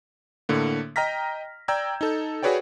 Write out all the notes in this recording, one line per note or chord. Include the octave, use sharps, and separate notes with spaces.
A2 D3 A#3
D#5 G5 A#5 F6 A#6 B6
D5 G5 A#5 E6 G6 G#6
D#4 A4
F#4 G#4 B4 C#5 D5 G5